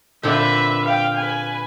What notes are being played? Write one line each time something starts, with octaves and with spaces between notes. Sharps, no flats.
A#2 D3 C4 B4 E5
F5 G5
B4 G#5